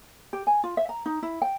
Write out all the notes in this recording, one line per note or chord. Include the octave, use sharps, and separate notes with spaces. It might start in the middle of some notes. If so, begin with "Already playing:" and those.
G4
G#5
F4
E5
A#5
D#4
E4
G5